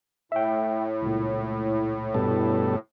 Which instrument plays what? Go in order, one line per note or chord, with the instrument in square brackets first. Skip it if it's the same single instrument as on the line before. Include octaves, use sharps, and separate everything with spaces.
[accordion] A2 [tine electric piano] E5 G5
[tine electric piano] C#2 A#2
[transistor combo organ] G2 B2 A4